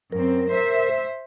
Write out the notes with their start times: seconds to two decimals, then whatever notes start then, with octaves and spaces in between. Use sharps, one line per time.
0.12 F#2 C4 A#4
0.50 C5 E5